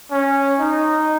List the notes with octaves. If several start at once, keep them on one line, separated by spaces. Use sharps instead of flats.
C#4
D#4